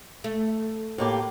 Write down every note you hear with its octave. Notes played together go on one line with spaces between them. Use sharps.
A3
A2 A#3 G4